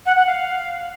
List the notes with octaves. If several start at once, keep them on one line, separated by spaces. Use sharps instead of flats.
F#5
F#5
F5